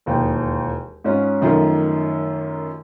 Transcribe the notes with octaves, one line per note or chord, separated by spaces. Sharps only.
E1 D#2 F3 G5
G#2 C#4 F4
F#2 D#3 F3 A3 F4